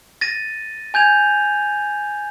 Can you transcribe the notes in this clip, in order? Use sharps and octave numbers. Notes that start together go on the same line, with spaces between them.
A6 A#6 D#7
G#5 G6 G#6 F7